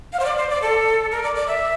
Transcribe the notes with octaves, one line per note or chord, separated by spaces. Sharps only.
F5
C5
D5
C5
D5
A4
A#4
D5
D5
E5